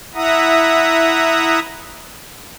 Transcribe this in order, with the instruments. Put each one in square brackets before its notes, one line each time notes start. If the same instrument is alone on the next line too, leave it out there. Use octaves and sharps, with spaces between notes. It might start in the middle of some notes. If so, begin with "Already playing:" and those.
[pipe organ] E4 E5 F#5 A#5 D#6